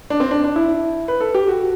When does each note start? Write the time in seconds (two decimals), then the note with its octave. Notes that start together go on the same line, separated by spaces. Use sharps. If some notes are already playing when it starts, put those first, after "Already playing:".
0.10 D4
0.20 C4
0.31 D4
0.44 D4
0.56 E4
1.08 B4
1.20 A4
1.35 G4
1.48 F#4